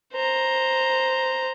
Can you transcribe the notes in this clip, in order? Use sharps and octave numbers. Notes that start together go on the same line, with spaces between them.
C5 A#5